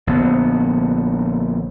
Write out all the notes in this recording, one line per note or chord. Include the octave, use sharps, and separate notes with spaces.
A#1 D3 B3